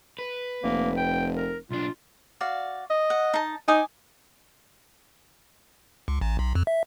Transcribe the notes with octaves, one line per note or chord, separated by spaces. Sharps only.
B4
F1 A#3
G5
A#4
B1 D4 F4
F#4 D5 F5
D#5
F#5
D#4 A5
D#4 G#5 D6 D#6
C#2
A1
B1
F2
E5